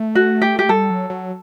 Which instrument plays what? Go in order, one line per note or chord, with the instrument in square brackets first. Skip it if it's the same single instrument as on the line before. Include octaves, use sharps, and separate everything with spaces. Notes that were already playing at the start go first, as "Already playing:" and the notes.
Already playing: [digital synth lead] A3
[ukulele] F#4
G4
G4
[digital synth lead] G3 [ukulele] A4
[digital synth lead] F#3
F#3